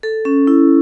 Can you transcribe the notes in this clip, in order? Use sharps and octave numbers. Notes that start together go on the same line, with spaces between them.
A4
C#4
E4